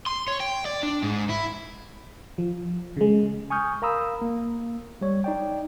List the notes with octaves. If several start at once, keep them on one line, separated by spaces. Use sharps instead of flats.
C6
C#5
G5
D5
D4
G#2
E4
F3
C#3 G#3
G#5 C#6 D#6 F6 G6
A#4 F5 A#5 B5 D#6 E6
A#3
G3 C#5
D#4 D5 G5